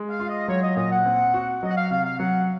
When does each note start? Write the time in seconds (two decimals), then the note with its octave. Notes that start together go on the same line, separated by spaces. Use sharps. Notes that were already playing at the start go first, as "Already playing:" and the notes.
Already playing: G#3
0.10 F5
0.20 F4
0.29 D#5
0.48 F#3 C#5
0.63 D#5
0.76 A#2 D#5
0.92 F#5
1.05 C4
1.34 F#4
1.63 F#3 D#5
1.71 F#5
1.77 F5
1.91 C3 F5
2.05 F5
2.19 F#3 F#5